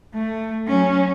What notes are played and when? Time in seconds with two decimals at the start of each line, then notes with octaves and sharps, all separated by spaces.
0.14 A3
0.68 F#3 C#4